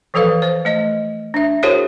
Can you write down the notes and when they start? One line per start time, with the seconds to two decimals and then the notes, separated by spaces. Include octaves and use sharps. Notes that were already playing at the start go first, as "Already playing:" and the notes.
0.14 E3 F3 A4 B4 F5
0.42 C5
0.65 A3 D#5
1.34 D4 E5
1.63 E4 F#4 G#4 A#4 C5 C#5